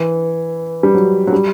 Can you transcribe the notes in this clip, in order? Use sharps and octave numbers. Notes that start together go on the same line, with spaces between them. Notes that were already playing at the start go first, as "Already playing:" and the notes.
Already playing: E3
G3
F#3
F#3
G3